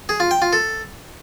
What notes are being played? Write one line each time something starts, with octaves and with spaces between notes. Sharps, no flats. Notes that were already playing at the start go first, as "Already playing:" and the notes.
G#4
F4
G5
F4
A4